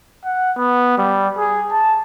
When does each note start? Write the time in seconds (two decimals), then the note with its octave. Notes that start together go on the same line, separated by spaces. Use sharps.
0.25 F#5
0.57 B3
0.98 G3
1.38 G#4
1.72 A5